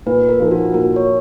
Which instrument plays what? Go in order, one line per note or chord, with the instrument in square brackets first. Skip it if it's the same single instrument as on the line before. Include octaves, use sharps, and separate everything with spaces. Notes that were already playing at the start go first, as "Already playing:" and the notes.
[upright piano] A#2 [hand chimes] B4
[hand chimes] A#4
[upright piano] F3 A#3 D#4 A#4
[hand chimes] F#4
[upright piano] A#2 [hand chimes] A#4
[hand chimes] C#5